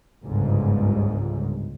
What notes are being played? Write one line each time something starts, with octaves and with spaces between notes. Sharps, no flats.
G1 C#2 G#2